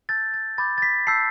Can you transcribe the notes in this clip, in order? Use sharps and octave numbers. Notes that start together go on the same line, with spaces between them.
A5 E6 G6 A6
A6
B5 D6 G6 A6
A6
B6
A5 E6 G6 C7